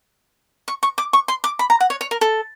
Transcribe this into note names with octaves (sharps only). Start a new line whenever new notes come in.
C#6
C#6
D6
C#6
C6
D6
B5
A#5
F#5
C#5
C#5
A#4
A4